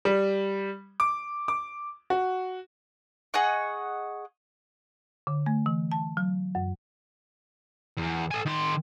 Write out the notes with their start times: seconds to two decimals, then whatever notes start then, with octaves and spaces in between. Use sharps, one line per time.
0.05 G3
1.00 D6
1.48 D6
2.10 F#4
3.34 G#4 D#5 F#5 C#6
5.27 D3
5.46 A3
5.66 E3
5.92 A5
6.17 F#3
6.55 F#2
7.97 E2
8.31 A4 G#5
8.46 D#3 C6